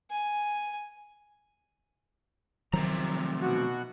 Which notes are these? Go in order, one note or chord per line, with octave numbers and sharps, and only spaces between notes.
G#5
F2 C3 D#3 F3 F#3 A#5
B2 F#4